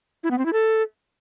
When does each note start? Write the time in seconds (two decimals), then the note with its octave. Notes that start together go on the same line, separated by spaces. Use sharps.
0.24 E4
0.31 B3
0.38 C4
0.46 E4
0.53 A4